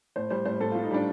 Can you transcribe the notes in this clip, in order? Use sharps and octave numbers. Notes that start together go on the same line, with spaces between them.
A2 C5
G3 C5
A2 C5
A2 A4
A2 F4
D#4
G3 D4